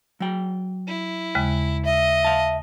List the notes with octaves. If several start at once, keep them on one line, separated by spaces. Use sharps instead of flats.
F#3 G5
E4
D#2 C#3 G#3
D#5 E5
F5 A5